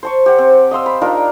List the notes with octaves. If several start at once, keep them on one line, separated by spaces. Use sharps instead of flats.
C5 A5 C#6
G4 F#5
C4
D#5 F5 C6 E6
B5
D4 D#4 F4 A#4